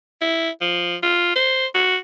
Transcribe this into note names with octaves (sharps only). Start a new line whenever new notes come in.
E4
F3
F4
C5
F#4